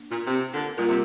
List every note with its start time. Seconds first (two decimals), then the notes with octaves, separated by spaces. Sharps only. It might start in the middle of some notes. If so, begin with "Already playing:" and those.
Already playing: A#3 D4
0.09 A#2
0.26 C3
0.52 A#2 D3
0.78 A#2 G3 A#3 F4 A#4
0.86 C3